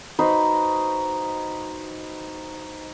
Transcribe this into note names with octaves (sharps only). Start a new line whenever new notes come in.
D#4 F#4 B4 C5